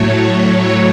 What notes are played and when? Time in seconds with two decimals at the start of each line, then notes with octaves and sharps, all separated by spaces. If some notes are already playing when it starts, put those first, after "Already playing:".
Already playing: A2 F#3 A3 C#5
0.19 C#5